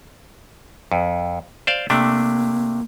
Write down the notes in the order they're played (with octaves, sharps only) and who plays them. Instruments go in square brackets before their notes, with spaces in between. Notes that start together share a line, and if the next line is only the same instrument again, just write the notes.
[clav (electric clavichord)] F2
C5 D5 F5
[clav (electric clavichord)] C3 A3 D4 [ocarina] A#3